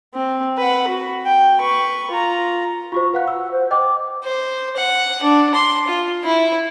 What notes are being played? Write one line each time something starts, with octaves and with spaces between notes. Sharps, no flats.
C4
B4 F#5
F#4
G5
B4 C#6
F4 A#5
F4 F#4 C5 C#6
B4 F5 F#5 F#6
E6
C5
C5 D#5 G5 D6
C5
F#5
D4
C6
F4
E4